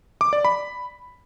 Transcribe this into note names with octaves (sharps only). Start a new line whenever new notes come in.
D6
D5
B5